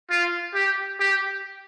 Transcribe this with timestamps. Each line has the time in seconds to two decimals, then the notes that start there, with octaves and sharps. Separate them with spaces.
0.11 F4
0.55 G4
1.00 G4